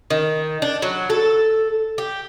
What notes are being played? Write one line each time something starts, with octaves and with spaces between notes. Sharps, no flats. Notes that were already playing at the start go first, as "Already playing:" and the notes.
D#3
D4
F#3
A4
G4